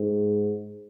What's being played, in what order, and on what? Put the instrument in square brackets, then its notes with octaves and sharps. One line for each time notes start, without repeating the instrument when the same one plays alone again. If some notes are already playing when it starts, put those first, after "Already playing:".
Already playing: [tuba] G#2